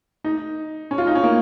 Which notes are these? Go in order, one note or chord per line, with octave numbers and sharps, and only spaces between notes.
D#4
C#4
F4
D#4
C#4
A#3